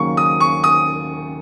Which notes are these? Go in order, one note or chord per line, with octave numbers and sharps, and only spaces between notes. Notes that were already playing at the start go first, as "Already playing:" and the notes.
Already playing: D#2 C#3 F#3 A#3 C#6
D#6
C#6
D#6